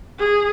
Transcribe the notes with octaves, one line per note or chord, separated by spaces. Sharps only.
G#4